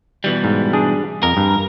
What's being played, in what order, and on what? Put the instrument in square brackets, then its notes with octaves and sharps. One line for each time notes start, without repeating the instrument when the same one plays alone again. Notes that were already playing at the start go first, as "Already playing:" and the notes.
[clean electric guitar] B2 E3 G3
[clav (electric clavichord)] G#2
D4 G#4
[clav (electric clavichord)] F2 [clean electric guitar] A#4
[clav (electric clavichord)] G2